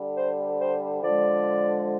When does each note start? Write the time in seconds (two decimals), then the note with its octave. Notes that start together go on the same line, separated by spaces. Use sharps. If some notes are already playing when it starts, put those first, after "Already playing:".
Already playing: D3 G3
0.16 C5
0.60 C5
1.02 D3 F3 G#3 D5